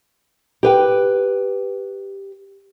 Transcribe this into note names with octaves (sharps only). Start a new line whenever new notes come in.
G4 B4 G5